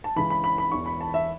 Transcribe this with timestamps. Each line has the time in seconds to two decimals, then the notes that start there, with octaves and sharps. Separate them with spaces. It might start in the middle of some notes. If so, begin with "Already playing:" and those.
0.04 A5
0.16 C#2 C#3 E3 B5
0.30 B5
0.44 B5
0.58 B5
0.72 E1 E2 E3 C#6
0.86 B5
1.01 A5
1.14 E5